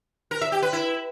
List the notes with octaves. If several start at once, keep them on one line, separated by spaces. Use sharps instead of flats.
A#4
E5
G4
B4
E4